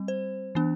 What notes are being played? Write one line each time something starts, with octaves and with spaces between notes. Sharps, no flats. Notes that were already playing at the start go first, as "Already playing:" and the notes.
Already playing: G3 C4
C5
E3 B3 D4